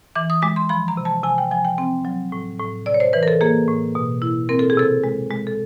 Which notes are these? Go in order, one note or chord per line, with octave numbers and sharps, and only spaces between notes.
E3 D6
D#6
G#3 D6
C6
F3 B5
A#5
C3
A5
C3 G#5
G5
F3 G#5
G5
C4 G5
F#3
A2
A2
C3 D5
C#5
C5
E3 B4
A#4
A4
A#3 G#4
A2
B2
E4
C4 A#4
A4
G#4
C3 A4
G#3
G#3
A4